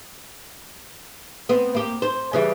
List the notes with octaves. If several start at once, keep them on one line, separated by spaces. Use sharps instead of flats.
B3 C4
A#3 G4
C5
C#3 E3 G3